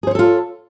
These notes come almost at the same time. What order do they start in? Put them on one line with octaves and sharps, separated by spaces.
G#4 C5 C#5 A4 F4